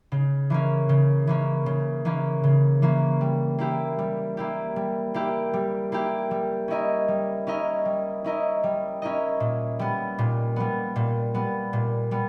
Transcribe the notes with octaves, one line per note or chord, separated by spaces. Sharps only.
C#3
E3 A#3 C#4
C#3
E3 A#3 C#4
C#3
E3 A#3 C#4
C#3
E3 A#3 C#4
G3
A#3 E4 G4
G3
A#3 E4 G4
G3
A#3 E4 G4
G3
A#3 E4 G4
G3
C#4 E4 A#4 D#5
G3
C#4 E4 A#4 D#5
G3
C#4 E4 A#4 D#5
G3
C#4 E4 A#4 D#5
A#2
G3 B3
A#2
G3 B3
A#2
G3 B3
A#2
G3 B3